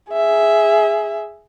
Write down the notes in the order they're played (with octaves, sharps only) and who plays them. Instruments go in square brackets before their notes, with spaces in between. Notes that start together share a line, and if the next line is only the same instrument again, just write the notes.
[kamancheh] G#4 E5